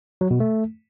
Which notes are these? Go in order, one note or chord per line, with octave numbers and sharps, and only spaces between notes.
F#3
B2
A3